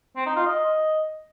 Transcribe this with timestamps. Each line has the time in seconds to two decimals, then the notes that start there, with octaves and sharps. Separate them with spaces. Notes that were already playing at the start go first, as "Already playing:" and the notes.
0.16 C4
0.26 D#4
0.36 F4
0.46 D#5